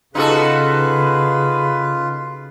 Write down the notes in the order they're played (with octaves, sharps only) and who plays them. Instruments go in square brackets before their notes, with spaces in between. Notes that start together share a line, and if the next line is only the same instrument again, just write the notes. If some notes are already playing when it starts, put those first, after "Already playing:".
[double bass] C#3 [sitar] D#4 F#4 A4 [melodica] F4 [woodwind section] G#4 B4